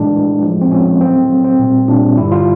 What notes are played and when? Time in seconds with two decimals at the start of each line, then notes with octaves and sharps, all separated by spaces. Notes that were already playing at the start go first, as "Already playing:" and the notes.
Already playing: A2 E3 G#3 D4
0.14 A2 E3 G#3
0.42 A2 F3 G#3
0.61 C4
0.71 A2 F3 G#3 C#4
1.01 A2 F#3 C4
1.30 A2 F#3
1.44 C4
1.59 A#2 G3
1.88 A#2 G3 D4
2.17 G2 D3 G3 E4
2.32 F4